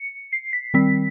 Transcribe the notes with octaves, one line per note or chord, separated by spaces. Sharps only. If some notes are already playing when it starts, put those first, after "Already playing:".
Already playing: C#7
C7
B6
D#3 G3 C4 B6